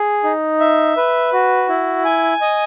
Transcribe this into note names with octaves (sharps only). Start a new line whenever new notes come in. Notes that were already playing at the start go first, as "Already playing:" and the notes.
Already playing: G#4
D#4
E5
B4
F#4
E4
G#5
D#5